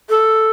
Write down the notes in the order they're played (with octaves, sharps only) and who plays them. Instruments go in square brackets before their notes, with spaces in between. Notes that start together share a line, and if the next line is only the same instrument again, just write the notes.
[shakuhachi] A4